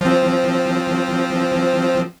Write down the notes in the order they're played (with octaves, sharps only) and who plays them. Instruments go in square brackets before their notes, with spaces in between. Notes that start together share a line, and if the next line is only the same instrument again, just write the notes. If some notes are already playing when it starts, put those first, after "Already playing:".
[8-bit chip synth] F3 C4